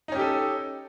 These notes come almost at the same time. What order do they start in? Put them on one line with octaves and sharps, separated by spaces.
D#4 C#4 G4 A4